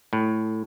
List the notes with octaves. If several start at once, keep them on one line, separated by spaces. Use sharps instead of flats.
A2